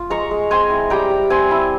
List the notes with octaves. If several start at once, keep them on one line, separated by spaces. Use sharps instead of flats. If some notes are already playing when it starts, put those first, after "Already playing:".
Already playing: F4
G#3 A#5 C#6
G#3
C4 G#5 C6
E4
G3 G5 A#5
G3
C4 G#5 C6
E4